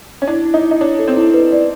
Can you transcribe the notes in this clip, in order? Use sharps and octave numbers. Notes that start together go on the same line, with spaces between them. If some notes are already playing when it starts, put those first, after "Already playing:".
C#4
D4 E4
E4
D#4
E4
D#4
D4 C#5
A4
C4
E4
B4
D5